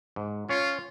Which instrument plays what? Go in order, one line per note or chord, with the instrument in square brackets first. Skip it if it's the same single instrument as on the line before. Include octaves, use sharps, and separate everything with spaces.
[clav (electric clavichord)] G#2
[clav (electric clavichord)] C#4 C#5 [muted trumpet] F4